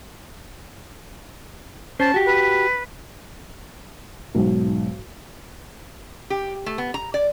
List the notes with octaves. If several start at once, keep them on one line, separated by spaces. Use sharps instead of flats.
C#4 C5 A5
F#4 G4
B4
B1 G#2
G4
A3
B3
A#5
D5